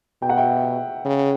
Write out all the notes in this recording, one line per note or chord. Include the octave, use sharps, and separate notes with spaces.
B2 G5
F#5
E5 G5
C#3